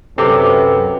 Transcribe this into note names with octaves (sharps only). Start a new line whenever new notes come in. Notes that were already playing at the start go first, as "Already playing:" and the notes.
F#2 C3 A4 B4 D6